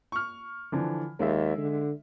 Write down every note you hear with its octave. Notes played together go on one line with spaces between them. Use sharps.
C#6 F6
D3 E3 F3
D#2 G#3 G#4 E5
D3